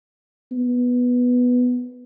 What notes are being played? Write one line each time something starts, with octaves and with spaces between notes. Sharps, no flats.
B3